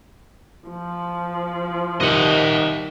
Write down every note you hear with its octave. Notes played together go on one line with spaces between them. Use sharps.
F3
C2 D#3 D#5 F#5 D#7